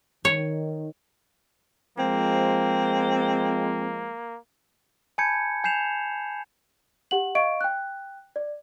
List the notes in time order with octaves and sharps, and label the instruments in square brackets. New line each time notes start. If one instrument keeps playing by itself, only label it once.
[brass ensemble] D#3 [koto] C#5
[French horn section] F3 G#3 [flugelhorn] A#3 [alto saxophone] C4
[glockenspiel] G#5 A5 B5 G6 G#6 C#7
G#5 G6 C7 E7 F7
[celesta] G4 F#5 F#7
D#5 F5 C#6 D7
G5 F#6
D5